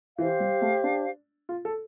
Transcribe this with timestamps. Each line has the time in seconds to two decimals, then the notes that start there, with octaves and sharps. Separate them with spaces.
0.18 E3 G4 C5 F5
0.40 G3
0.61 A3
0.84 D4
1.49 F4
1.65 A4